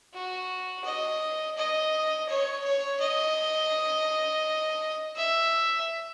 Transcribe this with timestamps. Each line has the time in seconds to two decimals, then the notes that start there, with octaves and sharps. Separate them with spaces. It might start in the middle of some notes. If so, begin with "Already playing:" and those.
0.14 F#4
0.85 D#5
1.58 D#5
2.29 C#5
2.64 C#5
3.01 D#5
5.16 E5